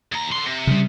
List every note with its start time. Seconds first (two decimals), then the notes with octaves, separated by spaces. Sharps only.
0.12 D#2 A#5
0.32 D3 C6
0.46 C3
0.67 C#3 G3